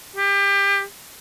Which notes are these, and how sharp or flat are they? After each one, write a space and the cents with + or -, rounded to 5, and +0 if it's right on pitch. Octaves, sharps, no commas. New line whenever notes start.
G4 +25